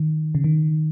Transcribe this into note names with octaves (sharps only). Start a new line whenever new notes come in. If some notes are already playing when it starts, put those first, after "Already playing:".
Already playing: D#3
C#3
D#3